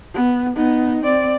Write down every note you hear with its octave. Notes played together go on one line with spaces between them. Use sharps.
B3
B3 D#4
C4 D5